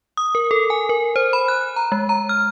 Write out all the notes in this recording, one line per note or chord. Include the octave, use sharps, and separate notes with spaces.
D#6
A#4
A4
G#5
A#4
C5
B5
F#6
A#5
G#3
A#5
F6